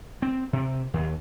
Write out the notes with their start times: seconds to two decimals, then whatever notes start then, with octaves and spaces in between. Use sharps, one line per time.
0.22 C4
0.53 C3
0.94 D#2